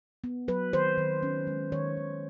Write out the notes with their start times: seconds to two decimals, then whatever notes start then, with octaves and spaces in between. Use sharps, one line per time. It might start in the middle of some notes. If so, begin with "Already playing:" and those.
0.24 B3
0.48 F#3 B4
0.73 D#3 C5
0.98 D#3
1.23 C#4
1.47 G#3
1.72 D#3 C#5
1.97 D#3